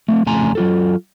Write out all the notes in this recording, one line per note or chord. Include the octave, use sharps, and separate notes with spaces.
A3 A#3 C4
F2 C#3 A3 G#5 A#5 C6
F#3 F4 A4